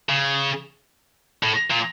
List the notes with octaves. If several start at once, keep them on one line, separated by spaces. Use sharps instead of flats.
C#3
A2
A#2